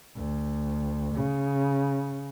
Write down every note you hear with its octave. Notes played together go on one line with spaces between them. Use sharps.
D2
C#3